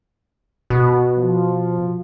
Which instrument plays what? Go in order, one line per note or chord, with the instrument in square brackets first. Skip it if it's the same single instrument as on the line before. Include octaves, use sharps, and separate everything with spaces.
[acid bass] B2
[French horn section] F3